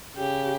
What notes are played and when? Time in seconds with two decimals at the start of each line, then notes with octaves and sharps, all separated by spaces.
0.17 C#3 G4